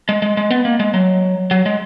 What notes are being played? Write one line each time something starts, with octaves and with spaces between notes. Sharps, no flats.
G#3
G#3
G#3
B3
A#3
G#3
F#3
F#3
G#3